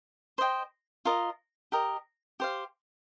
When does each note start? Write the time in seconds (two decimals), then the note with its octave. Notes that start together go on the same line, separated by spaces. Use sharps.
0.38 C5 D#5 G5
1.05 F4 A#4 D#5
1.72 G4 A#4 D#5
2.40 G4 C5 F5